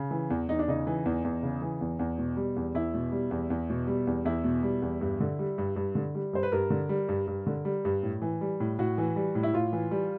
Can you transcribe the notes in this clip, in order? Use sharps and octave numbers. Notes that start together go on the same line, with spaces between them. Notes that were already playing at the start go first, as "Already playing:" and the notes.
Already playing: C#3
E3
E2
E2 D#4
D4
C#3 D#4
E3
E2
E2
C#3
E3
E2
E2
B2
G3
E2
E2 E4
B2
G3
E2
E2
B2
G3
E2
E2 E4
B2
G3
E2
G2
D3
G3
G2
G2
D3
G3
G2 C5
B4
G2 A#4
D3
G3
G2
G2
D3
G3
G2
A2
E3
G3
A2
A2 F#4
E3
G3
A2
E4
A2 F4
E3
G3